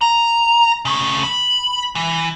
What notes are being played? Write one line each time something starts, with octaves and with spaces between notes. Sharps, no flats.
A#5
C#3 A3
B5
E3